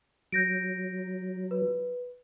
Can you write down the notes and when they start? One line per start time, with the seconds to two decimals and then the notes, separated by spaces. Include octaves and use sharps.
0.32 F#3 G6 A#6 D7
1.51 B4